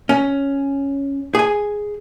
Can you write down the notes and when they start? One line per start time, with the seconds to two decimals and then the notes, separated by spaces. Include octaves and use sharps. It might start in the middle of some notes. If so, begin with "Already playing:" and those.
0.09 C#4
1.35 G#4 G#5